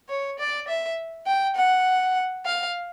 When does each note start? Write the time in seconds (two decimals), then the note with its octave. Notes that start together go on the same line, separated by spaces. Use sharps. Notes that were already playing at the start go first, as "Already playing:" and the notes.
0.09 C#5
0.39 D5
0.68 E5
1.27 G5
1.56 F#5
2.45 F5